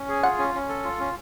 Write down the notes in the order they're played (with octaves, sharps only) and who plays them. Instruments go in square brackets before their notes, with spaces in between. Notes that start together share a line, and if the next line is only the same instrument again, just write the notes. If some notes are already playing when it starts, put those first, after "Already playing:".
Already playing: [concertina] C#4
G#4
[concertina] F4 [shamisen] F#5
[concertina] C#4
C#4
A4
F4
C#4